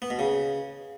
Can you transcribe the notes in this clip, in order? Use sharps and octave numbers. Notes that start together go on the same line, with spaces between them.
B3
B2
C#3